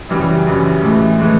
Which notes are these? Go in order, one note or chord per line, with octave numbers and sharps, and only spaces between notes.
F#2 C#3 E3 G3
F#2 C#3 E3 G3
A2 E3 G#3
A2 E3 G#3